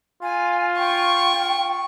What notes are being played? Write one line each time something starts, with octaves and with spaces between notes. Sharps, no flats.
F4 G#5
G5 C#6